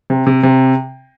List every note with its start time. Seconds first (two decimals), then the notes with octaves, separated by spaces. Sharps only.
0.10 C3
0.27 C3
0.43 C3